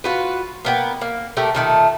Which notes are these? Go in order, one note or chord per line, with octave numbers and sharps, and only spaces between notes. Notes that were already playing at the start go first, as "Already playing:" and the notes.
F4 F#4 B4
A#3 B3 G5
A#3
A3 G4 A#4
A#2 D#3 A3